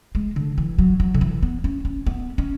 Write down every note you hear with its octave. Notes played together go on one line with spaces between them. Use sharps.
G#3
D3
E3
F#3
F#3
D3
E3
B3
C#4
C#4
B3
C#4